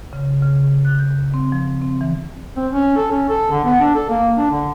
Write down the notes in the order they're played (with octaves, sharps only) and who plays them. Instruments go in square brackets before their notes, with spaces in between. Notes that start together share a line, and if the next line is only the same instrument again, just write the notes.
[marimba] C#3
C#3
F#6
G6
C4
F3
C4
E3
[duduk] C4
C#4
A4
C#4
A4
D3
B3
D4
A4
A#3
D4
D3